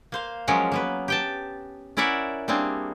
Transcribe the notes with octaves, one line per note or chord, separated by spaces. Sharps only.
A#3 C5 F5
F3 F#3 G#3 C#4 A#4
A#3 B3 B4
G4 G5 A5
C#4 E4 A#4 D5 E5 F#5
G3 A#3 C4 D4 G#4